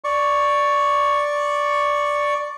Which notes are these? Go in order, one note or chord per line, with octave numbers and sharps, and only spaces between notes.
D5 C#6